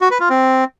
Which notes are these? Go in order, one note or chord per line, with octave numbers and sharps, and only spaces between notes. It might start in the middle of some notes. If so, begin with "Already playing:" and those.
F#4
B4
F4
C4